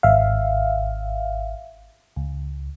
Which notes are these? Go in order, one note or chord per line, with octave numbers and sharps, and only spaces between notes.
G#1 E5 F5
C#2